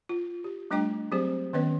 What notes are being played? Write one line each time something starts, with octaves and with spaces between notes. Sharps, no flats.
F4
G4
G3 A3 D4 D#5 G5 D6
F#3 C4 G4 G#4 C5
D#3 B3 C#4 B4 C#5 D#5